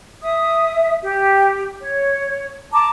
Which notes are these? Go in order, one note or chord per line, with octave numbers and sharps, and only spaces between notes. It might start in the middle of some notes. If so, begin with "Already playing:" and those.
E5 D#6
G4
C#5
A5 A#5 D6